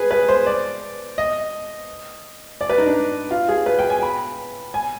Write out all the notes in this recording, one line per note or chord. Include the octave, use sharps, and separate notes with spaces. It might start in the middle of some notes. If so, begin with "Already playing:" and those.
Already playing: G#4 B4
B4
C5
D5
D#5
D5
B4
D#4
D4
F4
G#4
B4
G5
G#5
B5
G#5